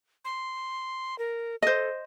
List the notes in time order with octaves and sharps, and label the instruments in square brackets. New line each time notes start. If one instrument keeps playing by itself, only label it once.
[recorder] C6
A#4
[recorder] A4 [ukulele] C5 D#5